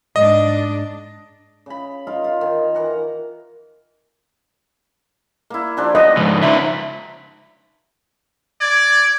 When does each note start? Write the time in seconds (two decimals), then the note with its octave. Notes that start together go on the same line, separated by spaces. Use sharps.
0.16 G#2 D4 D#5
1.66 C#3 B5
2.07 D#4 F4 A#4 F5
2.24 F4
2.41 D#3
2.75 E3 F#5 A#5
5.50 A#3 E4
5.77 F3 D4 G4
5.95 B3 D#5
6.17 G#2 C#3 A#5
6.42 C#3 F3 F#3 D#4 E5
8.61 D5 G#6